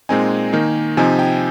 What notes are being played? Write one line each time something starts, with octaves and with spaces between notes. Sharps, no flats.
A#2 G#3 C4 D#4 G#5
D#3 A#3 D#4
C3 F3 C4 D#4 G#5
G5